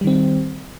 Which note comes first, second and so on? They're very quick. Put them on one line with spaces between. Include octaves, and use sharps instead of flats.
G3 D#3 C4